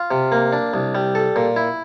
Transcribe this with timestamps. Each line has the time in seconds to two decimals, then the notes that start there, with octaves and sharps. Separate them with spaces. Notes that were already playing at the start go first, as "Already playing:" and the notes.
Already playing: F4
0.11 C3
0.32 A#3
0.53 D4
0.74 C2
0.95 G3
1.15 A4
1.36 A#2
1.56 E4